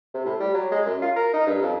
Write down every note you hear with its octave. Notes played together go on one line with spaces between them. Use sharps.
C3
A2
G3
F#3
G#3
F#2
F4
A#4
D#4
G2
F2